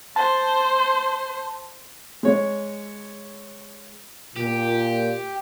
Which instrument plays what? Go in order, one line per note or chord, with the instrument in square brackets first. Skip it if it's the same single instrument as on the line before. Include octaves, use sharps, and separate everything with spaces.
[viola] C5 [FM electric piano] A5
[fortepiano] G#3 C#5
[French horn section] A#2 [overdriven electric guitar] G4